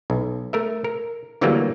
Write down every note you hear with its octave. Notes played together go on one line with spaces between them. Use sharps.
B1
A3 A#4 E5
A#4
D3 E3 F#3 G3 A3 A#3